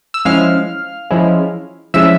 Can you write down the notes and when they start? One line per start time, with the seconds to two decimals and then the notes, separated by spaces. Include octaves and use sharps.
0.14 E6
0.25 F3 G#3 C#4 E4 F5 F6
1.11 F3 G#3 C#4 E4
1.94 F3 G#3 C#4 E4 E5 E6